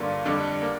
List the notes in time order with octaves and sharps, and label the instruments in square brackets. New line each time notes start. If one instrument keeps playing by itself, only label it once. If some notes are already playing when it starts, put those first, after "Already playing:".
Already playing: [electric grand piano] G2 D3 A#3 F4
F2 D3 G3 D4
A#3